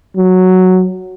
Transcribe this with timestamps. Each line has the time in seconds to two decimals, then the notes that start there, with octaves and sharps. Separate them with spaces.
0.17 F#3